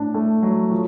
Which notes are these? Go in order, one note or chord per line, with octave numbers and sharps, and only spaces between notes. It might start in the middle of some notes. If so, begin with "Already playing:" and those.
Already playing: A2 D4
A3
F#3
F3